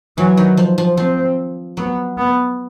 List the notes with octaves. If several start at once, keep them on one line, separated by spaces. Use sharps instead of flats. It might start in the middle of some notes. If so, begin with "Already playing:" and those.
E3 F#3
D#3
F3
F3
F3 C4
F#3 B3
B3